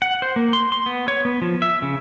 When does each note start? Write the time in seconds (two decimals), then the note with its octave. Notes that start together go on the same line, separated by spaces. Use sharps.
0.02 F#5
0.22 C5
0.36 A#3
0.53 C6
0.72 C6
0.86 B3
1.08 C#5
1.25 B3
1.42 F3
1.62 E5
1.82 C#3